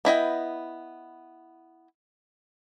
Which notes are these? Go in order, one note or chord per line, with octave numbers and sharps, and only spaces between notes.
B3 E4 D#5 G5